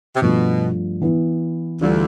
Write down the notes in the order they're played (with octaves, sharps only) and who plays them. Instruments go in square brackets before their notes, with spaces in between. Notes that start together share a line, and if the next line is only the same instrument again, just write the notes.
[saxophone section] C3
[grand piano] G2 F3 A3 [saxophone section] B2
[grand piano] E3 B3 E4
[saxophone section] D2 D3 [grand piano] E3 G3 D4 F4